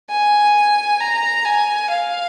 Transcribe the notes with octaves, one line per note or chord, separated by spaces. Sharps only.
G#5
A#5
G#5
F5